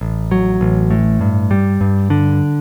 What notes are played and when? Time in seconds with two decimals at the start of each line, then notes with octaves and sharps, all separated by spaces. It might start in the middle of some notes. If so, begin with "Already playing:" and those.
0.01 A1
0.31 F#3
0.61 A1
0.91 A2
1.21 G2
1.51 G3
1.81 G2
2.10 D3